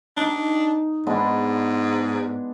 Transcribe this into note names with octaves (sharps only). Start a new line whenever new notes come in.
D4 D#4
G#2 G#3 B3 D4